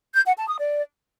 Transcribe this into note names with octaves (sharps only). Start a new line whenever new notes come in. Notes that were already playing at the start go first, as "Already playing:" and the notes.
G6
F#5
A5
D#6
D5